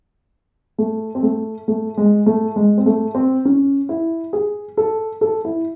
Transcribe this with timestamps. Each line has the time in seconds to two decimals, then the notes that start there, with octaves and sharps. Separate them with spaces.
0.78 A3
1.15 C4
1.23 A3
1.68 A3
1.97 G#3
2.26 A3
2.56 G#3
2.78 C4
2.86 A3
3.15 C4
3.45 C#4
3.89 E4
4.33 G#4
4.77 A4
5.21 A4
5.45 E4